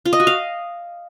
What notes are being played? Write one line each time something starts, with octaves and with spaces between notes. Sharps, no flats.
F4
D#5
F#4
F5